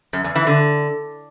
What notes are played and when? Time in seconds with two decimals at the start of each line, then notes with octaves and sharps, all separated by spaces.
0.13 F#2
0.24 E2
0.36 E3
0.47 D3